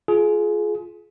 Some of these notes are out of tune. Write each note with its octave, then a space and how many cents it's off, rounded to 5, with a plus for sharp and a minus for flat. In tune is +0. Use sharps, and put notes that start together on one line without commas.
F4 +0 G#4 +25